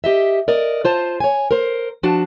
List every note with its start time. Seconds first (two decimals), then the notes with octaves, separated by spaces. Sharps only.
0.04 G4 D#5 E5
0.48 A#4 D5 D#5
0.85 F4 C5 A5
1.20 C#5 G#5
1.51 A#4 C5
2.03 F3 D4 F#4 A5